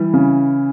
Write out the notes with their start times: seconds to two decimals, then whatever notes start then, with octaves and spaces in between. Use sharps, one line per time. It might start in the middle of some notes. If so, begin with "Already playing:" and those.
Already playing: E3 G3
0.13 C#3